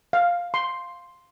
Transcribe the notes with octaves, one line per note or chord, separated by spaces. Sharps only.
F5
C6